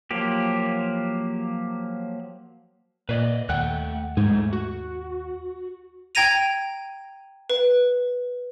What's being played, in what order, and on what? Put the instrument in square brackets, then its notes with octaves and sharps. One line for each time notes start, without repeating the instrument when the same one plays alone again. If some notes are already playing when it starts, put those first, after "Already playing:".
[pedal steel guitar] F3 F#3 A#3 G4
[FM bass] A#2 [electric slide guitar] B4 D5 D#5
[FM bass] D#2 [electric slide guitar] A3 F#5 G5 [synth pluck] F#6
[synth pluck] G#2 [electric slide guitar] A3 D#4 G#4
[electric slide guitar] F#4
[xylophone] G5 A#5 G#6 A#6 D#7 F7
B4